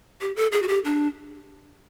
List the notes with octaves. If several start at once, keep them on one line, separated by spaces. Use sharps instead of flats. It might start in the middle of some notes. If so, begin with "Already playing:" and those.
G4
A4
G#4
F#4
G4
D4